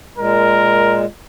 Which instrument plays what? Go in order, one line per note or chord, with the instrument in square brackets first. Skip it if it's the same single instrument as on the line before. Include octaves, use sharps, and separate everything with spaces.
[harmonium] A#2 G#3 [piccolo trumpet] A#4